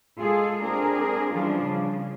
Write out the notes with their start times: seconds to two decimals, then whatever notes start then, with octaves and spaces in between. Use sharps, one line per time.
0.20 G#3 F4 G#4 A4
0.64 C4 D4 G#4 A#4
1.34 E3 F3 G3 C#4 D4 F4
1.65 C#3